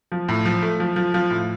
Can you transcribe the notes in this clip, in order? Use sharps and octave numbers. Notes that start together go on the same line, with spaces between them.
F3
A2
F3
A3
F3
F3
F3
A2